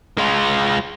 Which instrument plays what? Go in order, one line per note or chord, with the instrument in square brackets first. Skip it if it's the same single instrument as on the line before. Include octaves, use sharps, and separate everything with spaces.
[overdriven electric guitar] G#3 F4